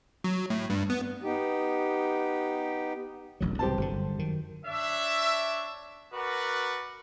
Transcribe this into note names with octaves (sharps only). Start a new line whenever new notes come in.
F#3
A2
G2
B3
B3 D#4 G4
E1 A1 F#3
C2 G#2 C#3 G4 C5 A5
G1 F#2 D3
F#2 D#3
D4 C#5 E5
F#4 A#4 B4 D5 F#5